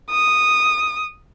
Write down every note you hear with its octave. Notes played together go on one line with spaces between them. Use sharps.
D#6